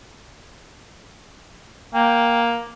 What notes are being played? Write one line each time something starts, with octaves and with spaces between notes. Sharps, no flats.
A#3 G5